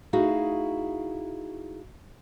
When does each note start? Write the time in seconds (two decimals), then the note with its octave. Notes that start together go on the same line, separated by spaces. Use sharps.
0.13 A3 D#4 E4 F#4 G#4 F5